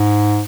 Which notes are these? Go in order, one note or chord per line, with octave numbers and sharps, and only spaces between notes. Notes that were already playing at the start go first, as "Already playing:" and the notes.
Already playing: G#2